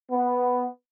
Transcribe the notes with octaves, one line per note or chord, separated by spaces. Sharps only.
B3